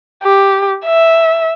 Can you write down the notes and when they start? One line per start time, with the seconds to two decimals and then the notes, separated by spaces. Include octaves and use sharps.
0.23 G4
0.85 E5